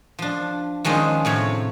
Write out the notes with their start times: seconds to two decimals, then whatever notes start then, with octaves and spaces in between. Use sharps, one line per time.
0.19 F3 D4
0.84 D#3 F3 G#3 C#4 D4
1.25 A2 C3 C#5